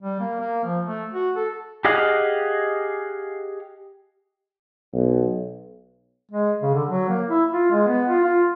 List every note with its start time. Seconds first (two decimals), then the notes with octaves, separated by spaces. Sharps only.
0.02 G3
0.20 A#3
0.41 A#3
0.65 F3
0.85 A3
1.14 F#4
1.36 A4
1.85 G4 G#4 D#5 F5 F#5
4.93 B1
6.31 G#3
6.62 C#3
6.74 D3
6.89 F#3
7.09 A#3
7.28 E4
7.51 F4
7.72 G#3
7.87 B3
8.08 F4
8.24 F4